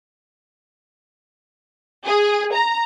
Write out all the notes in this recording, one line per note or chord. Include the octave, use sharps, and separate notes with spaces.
G#4
A#5